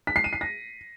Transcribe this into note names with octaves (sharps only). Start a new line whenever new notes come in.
B6
C7
D#7
C7
A#6